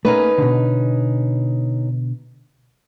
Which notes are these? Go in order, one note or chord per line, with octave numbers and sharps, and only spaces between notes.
A3 A#3 C#4 D#4 B4
B2 D3